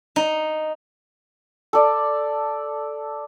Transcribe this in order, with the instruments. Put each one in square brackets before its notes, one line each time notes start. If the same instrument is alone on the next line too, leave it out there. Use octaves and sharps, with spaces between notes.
[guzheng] D#4
[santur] A4 D5